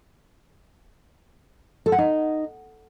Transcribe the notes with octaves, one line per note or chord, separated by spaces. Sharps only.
A4
F#5
D#4